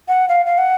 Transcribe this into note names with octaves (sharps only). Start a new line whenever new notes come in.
F#5
F5
F5
F#5